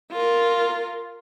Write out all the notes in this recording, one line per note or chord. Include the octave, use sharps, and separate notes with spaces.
F4 A#4